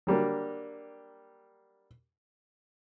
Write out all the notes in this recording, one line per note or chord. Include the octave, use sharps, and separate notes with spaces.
F#3 G3 A#3 D4